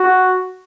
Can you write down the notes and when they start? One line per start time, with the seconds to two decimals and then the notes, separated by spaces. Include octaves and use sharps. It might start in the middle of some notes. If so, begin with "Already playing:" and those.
Already playing: F#4